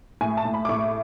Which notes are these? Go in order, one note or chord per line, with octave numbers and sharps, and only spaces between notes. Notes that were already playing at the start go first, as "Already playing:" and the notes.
A2 G#5
A5
A2
B5
D6
A2 C#6